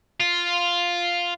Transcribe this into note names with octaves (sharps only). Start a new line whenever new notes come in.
F4